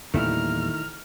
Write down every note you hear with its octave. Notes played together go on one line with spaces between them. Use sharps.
E2 A#2 D#3 G3 A3 E4 A#5 F6